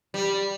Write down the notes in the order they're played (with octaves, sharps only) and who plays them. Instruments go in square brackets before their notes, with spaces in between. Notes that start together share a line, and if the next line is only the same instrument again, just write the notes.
[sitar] G3